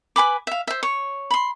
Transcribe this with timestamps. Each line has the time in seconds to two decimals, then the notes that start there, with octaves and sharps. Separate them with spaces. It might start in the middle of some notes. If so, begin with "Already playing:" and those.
0.16 B4 G#5 B5 D6
0.47 E5 F5
0.67 C5 E5
0.83 C#5
1.31 B5 C6